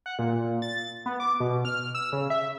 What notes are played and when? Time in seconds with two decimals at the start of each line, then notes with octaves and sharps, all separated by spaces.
0.06 F#5
0.19 A#2
0.62 A6
1.06 B3
1.20 D6
1.40 B2
1.65 F6
1.95 E6
2.13 C#3
2.30 E5